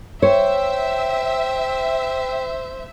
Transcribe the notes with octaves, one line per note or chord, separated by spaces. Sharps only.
C5 C#5 E5 G5